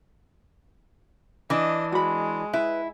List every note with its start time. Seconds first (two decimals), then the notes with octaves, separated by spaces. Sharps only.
1.50 E3 D4 D#5
1.92 G#3 F#4 B5
2.54 E4 B4